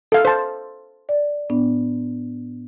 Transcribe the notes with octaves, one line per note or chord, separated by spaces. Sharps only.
A4 F5
C5 A5
D5
A2 B3 D4